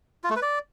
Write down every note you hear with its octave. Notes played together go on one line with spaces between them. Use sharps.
F4
A3
B4
D5